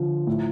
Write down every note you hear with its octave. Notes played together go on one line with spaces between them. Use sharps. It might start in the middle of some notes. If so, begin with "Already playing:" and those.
Already playing: D3 F3
A2